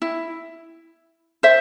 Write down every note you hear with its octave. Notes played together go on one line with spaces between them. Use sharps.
E4
C5 E5